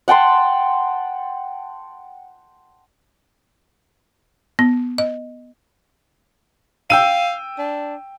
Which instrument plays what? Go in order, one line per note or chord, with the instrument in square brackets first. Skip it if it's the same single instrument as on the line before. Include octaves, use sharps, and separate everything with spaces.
[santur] F#5 G5 A5 C6
[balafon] B3
D#5
[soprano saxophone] F5 [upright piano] G5 E6 D#7
[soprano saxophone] D4